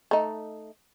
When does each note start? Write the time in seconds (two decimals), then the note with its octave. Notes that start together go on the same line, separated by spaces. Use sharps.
0.11 A3 D#4